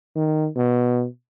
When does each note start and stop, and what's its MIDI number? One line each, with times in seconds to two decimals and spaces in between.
0.16 0.48 51
0.57 1.05 47